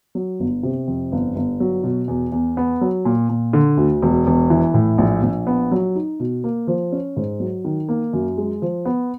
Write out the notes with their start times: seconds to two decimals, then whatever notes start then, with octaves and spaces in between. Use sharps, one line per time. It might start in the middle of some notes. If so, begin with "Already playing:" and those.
0.15 F#3
0.40 G1
0.63 C3
0.87 F2
1.12 G1
1.36 G1
1.60 F#3
1.84 B2
2.08 E2
2.32 E2
2.57 B3
2.81 F#3
3.05 A#2
3.29 A#2
3.53 D3
3.77 D2
4.02 E1
4.27 E1
4.50 E3
4.74 A2
4.98 A#1
5.23 A#1
5.47 B3
5.72 F#3
5.95 D#4
6.20 B2
6.44 A#3
6.67 F3
6.92 C#4
7.16 G#2
7.40 F#3
7.65 D#3
7.89 A#3
8.13 F#2
8.38 G#3
8.62 F3
8.85 B3